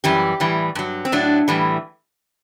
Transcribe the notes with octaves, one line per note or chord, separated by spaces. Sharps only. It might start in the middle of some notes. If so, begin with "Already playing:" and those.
F#2 E3 G3 G4
A2 E3 G3
G2 F#3
C4
A2 F#3 D4
A2 E3 G3